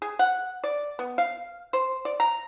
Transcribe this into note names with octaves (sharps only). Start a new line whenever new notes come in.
G#4
F#5
D5
B3
F5
C5
D5
A#5